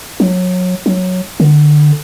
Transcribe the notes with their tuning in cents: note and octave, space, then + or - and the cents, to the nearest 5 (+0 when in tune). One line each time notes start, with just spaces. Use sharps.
F#3 -25
F#3 -10
D3 +20